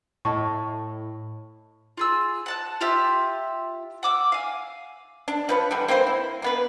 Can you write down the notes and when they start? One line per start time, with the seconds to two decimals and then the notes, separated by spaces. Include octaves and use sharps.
0.25 A2 D#5 A5 C#6
1.97 F4 G#4 E6
2.46 F#5 A5 F#6
2.81 F4 G4 E5
4.03 F#5 D6 E6
4.32 F5 G#5
5.28 D4
5.49 F3 B4 C#5
5.71 D3 E3 G3
5.88 A#3 C4 B4 C5
6.07 E4
6.42 A#3 B3 B4